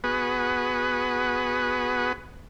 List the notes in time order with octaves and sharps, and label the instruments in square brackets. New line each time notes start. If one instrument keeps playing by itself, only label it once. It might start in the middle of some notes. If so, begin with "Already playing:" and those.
[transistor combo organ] B3 F#4 G#4 B4